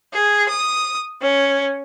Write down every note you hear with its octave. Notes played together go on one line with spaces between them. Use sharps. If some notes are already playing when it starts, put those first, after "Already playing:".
G#4
D#6
C#4